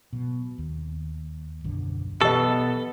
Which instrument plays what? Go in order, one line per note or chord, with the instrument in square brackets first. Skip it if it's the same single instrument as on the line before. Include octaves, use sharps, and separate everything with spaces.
[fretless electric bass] B2 F#3
D#2
B1 F#2 D3
[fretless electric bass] B2 E3 F#3 [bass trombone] B3 [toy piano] G4 D#5 [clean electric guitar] A4